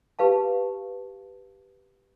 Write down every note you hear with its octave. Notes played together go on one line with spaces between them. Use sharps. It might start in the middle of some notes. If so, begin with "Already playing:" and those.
G4 B4 F5 A5